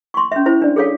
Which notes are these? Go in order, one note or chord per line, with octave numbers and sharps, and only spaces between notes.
C6 C#6
C#4 E5
E4 C5
D4 D5
G#4 A4 C#5 F5